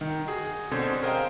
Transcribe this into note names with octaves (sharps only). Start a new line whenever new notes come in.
D#3
F#4 G#4
B2 D3 C4 C#4 C5 C#5
G#4 A#4 C5 D#5 F5 G5